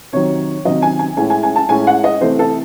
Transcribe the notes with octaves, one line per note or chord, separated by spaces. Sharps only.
C3 D#3 F#3 C#5
C3 D#3 F#3 D#5
G#5
G#5
A2 G#3 C#4 E4 G#5
G#5
G#5
A5
A2 G#3 C#4 E4 G#5
F#5
D#5
C3 E3 A3 C5
A4